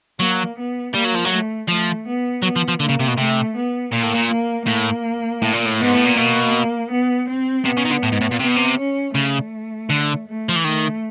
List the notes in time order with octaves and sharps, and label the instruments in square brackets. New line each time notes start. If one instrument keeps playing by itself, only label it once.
[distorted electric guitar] F#3 [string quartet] A#3
[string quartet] B3
[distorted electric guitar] G3 [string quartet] A#3
[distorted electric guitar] F#3
F3
F#3
[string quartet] A3
[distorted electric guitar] F3 [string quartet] A3
[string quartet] B3
[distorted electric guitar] F#3 [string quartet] B3
[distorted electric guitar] F3
F3
[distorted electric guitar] D3 [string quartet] A#3
[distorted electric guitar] C#3
C3
B2
[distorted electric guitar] C3 [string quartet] A3
[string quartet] B3
[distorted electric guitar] A#2 [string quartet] A#3
[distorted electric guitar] A2
A#2
[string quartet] A#3
[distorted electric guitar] A2 [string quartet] A#3
[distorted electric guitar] A2
A#2
A2
[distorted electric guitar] G#2 [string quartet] B3
[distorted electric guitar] A2
A#2
[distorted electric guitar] B2 [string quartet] A#3
[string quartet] B3
C4
[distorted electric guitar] C3 [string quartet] B3
[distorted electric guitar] C#3
D#3
D3
A2
G#2
A2
A#2
[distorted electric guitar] C3 [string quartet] B3
[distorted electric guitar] B2
C3
[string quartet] C#4
[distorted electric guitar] C#3 [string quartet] A3
[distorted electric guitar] D3
[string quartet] A3
[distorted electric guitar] F3
E3
[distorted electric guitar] D#3 [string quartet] A3